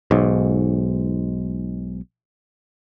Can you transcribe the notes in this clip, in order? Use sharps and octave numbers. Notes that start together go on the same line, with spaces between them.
B1 G#2